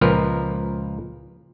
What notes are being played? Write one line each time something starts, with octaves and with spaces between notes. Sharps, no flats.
C#2 A#2 F3 A#4 B4